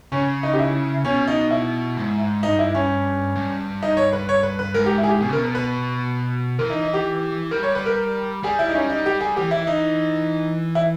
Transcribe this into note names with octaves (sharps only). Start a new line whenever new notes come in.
C#3 C#4
D#4
G4
E4
B2 C#4
D#4
E4
G#2
G2 D#4
E4
C#4
G2
D#4
C#5
B4
C#5
B4
B4
G#2 A#4
G4
E4
G#4
G4
B2 G#4
C#3
A#4
B2
B4
B4
E3 A#4
D#4
D#4
G4
G3 A#4
C#5
B4
A#4
G3 G#4
E4
D#4
C#4
D#4
G4
G#4
E3 G4
E4
D#4
E4